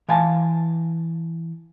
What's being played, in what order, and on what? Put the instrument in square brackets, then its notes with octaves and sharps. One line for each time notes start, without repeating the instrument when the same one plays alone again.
[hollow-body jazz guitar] E3 F5 G#5 A5